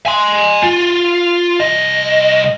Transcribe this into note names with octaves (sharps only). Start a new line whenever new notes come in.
G#5 C6
F4
C2 D#5